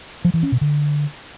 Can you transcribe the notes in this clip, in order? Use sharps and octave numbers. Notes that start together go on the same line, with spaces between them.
F3
E3
C#4
B2
D3